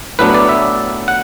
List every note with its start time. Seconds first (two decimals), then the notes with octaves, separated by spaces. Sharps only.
0.19 A2 F#3 B3 D4 B4
0.34 D5
0.49 E5
1.08 F#5